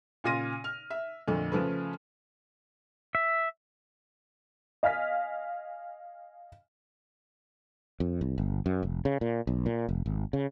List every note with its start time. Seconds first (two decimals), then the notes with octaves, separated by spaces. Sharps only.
0.24 A#2 C#3 F4 A#6 D#7
0.64 F6
0.90 E5
1.28 F2 A#2 D3 A3
1.52 C#3 F3 A3 B4
3.15 E5
4.83 D#5 F5 G#5 F6 B6
8.00 F2
8.21 C2
8.38 G1
8.66 F#2
8.83 F1
9.05 C#3
9.21 A#2
9.47 B1
9.66 A#2
9.89 F1
10.06 G#1
10.33 C#3